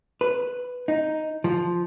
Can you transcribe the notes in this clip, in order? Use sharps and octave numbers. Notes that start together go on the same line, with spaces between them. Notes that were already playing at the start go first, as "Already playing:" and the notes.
B4
D#4
F3